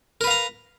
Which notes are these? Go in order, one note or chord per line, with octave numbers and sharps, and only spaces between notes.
A#4 B4 F5 A#5